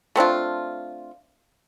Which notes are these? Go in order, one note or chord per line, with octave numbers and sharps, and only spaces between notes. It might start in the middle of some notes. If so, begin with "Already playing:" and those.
A3 C4 D4 F4